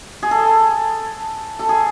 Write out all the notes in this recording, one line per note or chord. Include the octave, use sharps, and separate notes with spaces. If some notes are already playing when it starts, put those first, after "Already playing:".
G#4
A4
A4
G#4